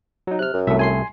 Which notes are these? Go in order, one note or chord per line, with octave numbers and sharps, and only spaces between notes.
F#3 D#4
C3 F6 F#6
F#2
C2 A3 E5
G#5 C6 C7